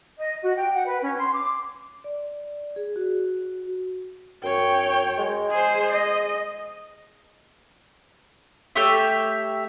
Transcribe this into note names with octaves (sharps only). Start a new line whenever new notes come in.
D#5
F#4
G5
F#5
B4
C#4
C6
D6
D5
G#4
F#4
F#2 C#5 G5
G#3
G#4 C5
D#5
A3 G4 C#5 E5